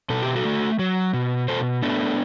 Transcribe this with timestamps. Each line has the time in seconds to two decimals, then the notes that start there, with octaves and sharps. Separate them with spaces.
0.10 B2 A4
0.22 G4
0.36 F#4 A4
0.45 A3
0.79 F#3
1.13 B2
1.48 B2 A4 C5
1.83 A3 B3 D4